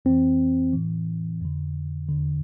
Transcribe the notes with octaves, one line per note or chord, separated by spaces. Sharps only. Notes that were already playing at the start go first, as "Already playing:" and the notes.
F2 E3 C4
A2 E3
F2 D3
E2 D3